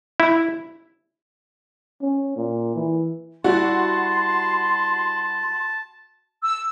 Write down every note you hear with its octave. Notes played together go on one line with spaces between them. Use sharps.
E4
C#4
A#2
E3
G3 E4 F#4 A5 B5 C6
E6